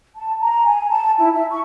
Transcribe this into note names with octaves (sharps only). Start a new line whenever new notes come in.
A5
A#5
G#5
A5
E4
E5
C#6